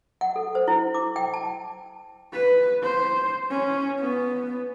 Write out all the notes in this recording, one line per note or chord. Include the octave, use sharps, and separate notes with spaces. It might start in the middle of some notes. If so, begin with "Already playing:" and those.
F#5
A4
C5
E4
D6
G5
A5
B4
C5
C#4
B3